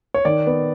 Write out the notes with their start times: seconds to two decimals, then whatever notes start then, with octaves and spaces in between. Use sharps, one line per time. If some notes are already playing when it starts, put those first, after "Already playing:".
0.14 C#5
0.25 D#3 D5
0.47 B3